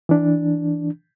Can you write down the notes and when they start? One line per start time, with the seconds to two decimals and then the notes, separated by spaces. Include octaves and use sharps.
0.09 E3 D4